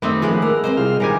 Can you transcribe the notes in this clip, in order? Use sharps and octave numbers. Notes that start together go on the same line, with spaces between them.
F#2 D#3 G3 A3 C4 D#4 B4 E5
F3 G#3 A#3 B3 C#4 G4 G#4
A#4 D6 E6
C4 A#4 C5 D#5
C3 G3 E4 F4 G#4 F6
A#2 D#3 E3 G4 G#5 A#5